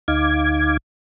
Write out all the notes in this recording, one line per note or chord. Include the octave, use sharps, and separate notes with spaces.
D2 D#4 F5 D6 G#6